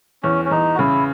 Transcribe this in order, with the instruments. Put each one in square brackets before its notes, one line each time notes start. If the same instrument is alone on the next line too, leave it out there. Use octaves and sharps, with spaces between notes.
[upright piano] E2 [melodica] C#4
[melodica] C#4
[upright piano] E2 [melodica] D#4
[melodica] F#4
[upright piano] C#3 [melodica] E4